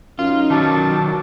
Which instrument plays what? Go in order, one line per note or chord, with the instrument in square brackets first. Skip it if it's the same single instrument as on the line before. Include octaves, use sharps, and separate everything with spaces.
[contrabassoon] F#2 [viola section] D#4 [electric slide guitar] F4
[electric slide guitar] D#3 F#3 [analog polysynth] A5 D6 A6